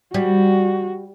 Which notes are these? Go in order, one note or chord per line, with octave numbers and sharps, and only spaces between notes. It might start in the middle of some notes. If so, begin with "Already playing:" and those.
G3 F#4